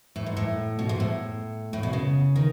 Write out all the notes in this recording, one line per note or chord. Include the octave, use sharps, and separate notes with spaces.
A2
G#2
A2
B2
G#2
A2
A2
B2
C#3
D#3